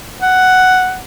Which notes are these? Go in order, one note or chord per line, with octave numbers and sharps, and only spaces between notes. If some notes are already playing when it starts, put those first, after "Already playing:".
F#5